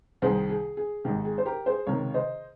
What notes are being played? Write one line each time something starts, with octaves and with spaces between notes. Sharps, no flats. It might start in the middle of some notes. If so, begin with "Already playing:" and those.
C2 C3 D#3 G#4 C5
G#4
G#4
G#1 G#2 D#3 G4
G#4
C5
G4 A#4
G#4 C5
C#2 C3 D#3 A#4 C#5
C5 D#5